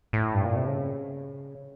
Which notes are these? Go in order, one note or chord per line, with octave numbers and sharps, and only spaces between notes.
A2
G2
A#2
C3
C#3